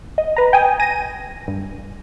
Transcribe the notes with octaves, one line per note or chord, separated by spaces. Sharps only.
D#5
B4 A#5
G5 G#5 D#6
G#5 A#6 D#7
G2